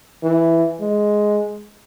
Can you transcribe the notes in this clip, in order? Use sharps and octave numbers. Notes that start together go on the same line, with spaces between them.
E3
G#3